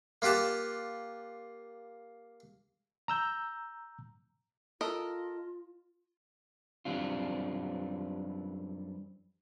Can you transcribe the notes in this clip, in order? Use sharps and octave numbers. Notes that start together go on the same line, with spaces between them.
A#3 F4 G4 F#5 A5
A#5 E6 G6
F4 A4 A#4 D#5
F#2 E3 G3 C4 D4 F4